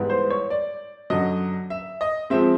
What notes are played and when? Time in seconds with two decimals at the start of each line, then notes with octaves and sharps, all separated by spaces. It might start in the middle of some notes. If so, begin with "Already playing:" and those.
Already playing: G#2 E3 G3 B3
0.10 C5
0.30 C#5
0.50 D5
1.10 F#2 D3 F#3 D#5
1.70 E5
2.01 D#5
2.30 F3 G#3 C4 E5